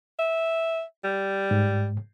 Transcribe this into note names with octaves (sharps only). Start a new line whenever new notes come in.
E5
G3
G#2